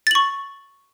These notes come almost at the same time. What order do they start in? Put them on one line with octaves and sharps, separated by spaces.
A6 F#7 C#6